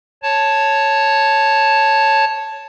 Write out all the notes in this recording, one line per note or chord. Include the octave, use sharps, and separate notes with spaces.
C#5 A5